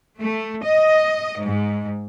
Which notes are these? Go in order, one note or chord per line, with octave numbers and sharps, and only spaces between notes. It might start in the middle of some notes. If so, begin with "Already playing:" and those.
A3
D#5
G#2